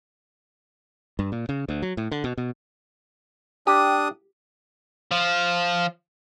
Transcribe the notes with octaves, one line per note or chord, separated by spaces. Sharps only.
G2
A#2
C#3
D2
F#3
A2
D3
B2
B2
D4 G4 D#6
F3